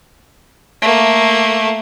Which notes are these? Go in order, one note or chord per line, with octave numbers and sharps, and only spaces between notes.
A3 A#3